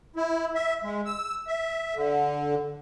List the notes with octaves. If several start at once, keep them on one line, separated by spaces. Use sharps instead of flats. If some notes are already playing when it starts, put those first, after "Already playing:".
E4
E5
G#3
E6
E5
D3